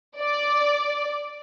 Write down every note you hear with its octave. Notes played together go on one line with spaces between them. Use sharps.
D5